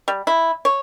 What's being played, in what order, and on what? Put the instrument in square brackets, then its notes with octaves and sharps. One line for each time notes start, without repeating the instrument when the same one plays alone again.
[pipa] G3
E4
C#5